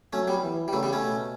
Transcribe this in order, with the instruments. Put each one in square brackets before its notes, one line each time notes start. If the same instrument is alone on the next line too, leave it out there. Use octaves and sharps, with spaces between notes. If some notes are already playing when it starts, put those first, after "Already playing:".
[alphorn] F#3 [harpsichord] A3 C#4
[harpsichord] G3 B3
[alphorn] E3
[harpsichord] G3
[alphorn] C#3 [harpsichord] F#3 A3
[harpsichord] G3 B3
A3 C#4
[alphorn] B2